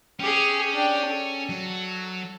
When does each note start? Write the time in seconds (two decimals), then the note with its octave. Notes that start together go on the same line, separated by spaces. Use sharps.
0.20 C#4 G4 G#4
0.74 D4 G5
1.06 A4
1.49 F#3